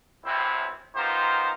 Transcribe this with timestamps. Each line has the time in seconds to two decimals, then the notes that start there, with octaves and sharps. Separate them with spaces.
0.25 A1 F#2 C3 C4 E4
0.96 B3 D#4 F4 G4 A#4 C5